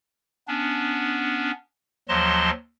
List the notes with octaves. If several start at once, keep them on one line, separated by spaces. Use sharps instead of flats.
B3 C#4 D4
D#2 F3 F#3 D#5 A5 C6